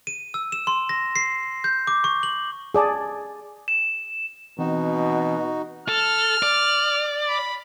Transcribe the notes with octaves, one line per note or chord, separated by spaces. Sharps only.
D#7
E6
E7
C6
A#6
C7
G6
D6
C#6
F#7
G#4 D5 A5
E7
B2 E3 C4 D#4 F#4
A4 F6
D5
B5